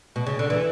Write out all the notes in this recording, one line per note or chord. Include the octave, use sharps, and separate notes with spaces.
B2
C#3
D3
E3